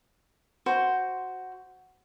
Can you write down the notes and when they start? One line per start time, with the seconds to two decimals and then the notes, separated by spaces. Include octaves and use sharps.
0.66 F#4 C5